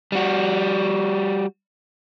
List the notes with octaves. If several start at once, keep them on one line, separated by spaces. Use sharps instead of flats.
G3 F#4